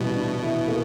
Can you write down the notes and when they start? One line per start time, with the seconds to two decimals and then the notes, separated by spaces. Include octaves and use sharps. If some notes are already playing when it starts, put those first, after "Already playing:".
Already playing: B2 E3 G3
0.15 D4
0.42 E3
0.68 A#3